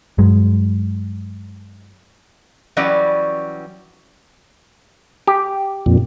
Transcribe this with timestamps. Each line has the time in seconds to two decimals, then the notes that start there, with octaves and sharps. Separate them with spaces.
0.18 G2 F#3 G#3
2.77 E3 F#3 G3 C#4 D5
5.27 G4
5.86 F2 A#2